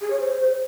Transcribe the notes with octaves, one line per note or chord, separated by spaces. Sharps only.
G#4
C#5
C5